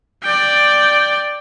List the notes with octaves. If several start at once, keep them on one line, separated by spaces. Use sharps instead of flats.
D5 G5